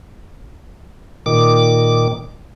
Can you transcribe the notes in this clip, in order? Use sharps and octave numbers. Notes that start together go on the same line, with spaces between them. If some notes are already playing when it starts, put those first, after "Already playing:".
A#2 D#3 D6